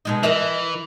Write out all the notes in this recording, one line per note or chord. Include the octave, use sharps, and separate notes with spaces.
B2 G#3 D#4
E3 A#4 D#5 E5